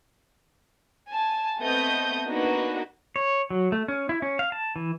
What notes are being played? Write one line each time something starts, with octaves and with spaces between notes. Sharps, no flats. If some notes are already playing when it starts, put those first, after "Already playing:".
G#5 A5
A3 B3 C4 D#5 D#6 G6
A#3 B3 D4 D#4 F#4 B4
C#5
F#3
A3
C#4
E4
C#4
F5
A5
E3